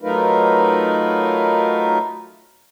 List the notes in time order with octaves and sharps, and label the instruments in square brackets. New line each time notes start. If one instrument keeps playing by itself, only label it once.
[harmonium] F#3 A3 D#4 F4 A#4 B4